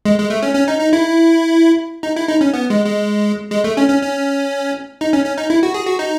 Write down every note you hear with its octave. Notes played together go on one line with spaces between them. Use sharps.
G#3
G#3
A3
C#4
C#4
D#4
D#4
E4
D#4
E4
D#4
C#4
B3
G#3
G#3
G#3
A3
C#4
C#4
C#4
D#4
C#4
C#4
D#4
E4
F#4
G#4
F#4
D#4